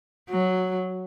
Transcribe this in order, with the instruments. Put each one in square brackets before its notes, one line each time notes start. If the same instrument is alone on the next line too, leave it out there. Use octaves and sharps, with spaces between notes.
[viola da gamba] F#3